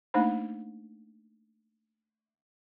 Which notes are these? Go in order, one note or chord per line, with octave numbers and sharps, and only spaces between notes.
A3 A#3 D4 D#4 C5 B5